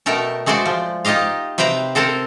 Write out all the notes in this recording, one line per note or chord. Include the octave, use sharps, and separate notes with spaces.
B2 A3 A#4 G5 A5
G#3 A3 F#4 C5 D5
F3
D#4 F4 G4 D#5 F5
C3 B4 C5 G5 A#5
C4 A4 A#4 C5